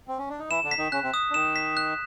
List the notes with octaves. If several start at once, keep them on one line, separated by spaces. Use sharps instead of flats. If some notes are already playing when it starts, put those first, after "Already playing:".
C4
C#4
D4
D#4
E3 E4 E7
D3 D4
B6
D#3 D#4
C#3 C#4 F#6
C3 C4
D#6
D4
D#3 D#4 E7
B6
F#6